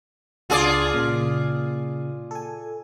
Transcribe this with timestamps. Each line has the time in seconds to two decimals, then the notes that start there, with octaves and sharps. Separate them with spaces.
0.50 C#2 D4 F4 G#4 D5 G#5
0.94 A#2 C#3 A#3
2.31 A4 G#5